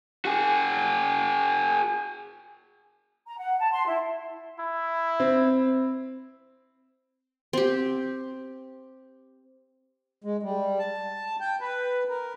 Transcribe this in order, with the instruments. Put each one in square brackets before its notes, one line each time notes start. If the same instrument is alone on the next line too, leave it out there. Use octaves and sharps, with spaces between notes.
[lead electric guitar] F#4 G#4
[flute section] A#5
F#5
A5
C6
E4
[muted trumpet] E4
[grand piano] C4
[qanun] C4 G4
[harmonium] G#3
G3
A5
G5
B4
A#4